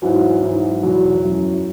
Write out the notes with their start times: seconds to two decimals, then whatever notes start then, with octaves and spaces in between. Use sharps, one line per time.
0.02 G#2 E3 F#3
0.43 G#2 E3
0.83 E2 B2 F#3
1.24 F#2 E3